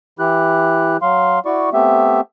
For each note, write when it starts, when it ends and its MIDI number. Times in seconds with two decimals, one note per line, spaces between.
0.19 0.97 52
0.19 0.97 64
0.19 0.97 67
0.19 0.97 90
1.02 1.39 54
1.02 1.39 77
1.02 1.39 84
1.45 1.70 64
1.45 1.70 66
1.45 1.70 74
1.45 1.70 85
1.73 2.21 57
1.73 2.21 59
1.73 2.21 60
1.73 2.21 67
1.73 2.21 76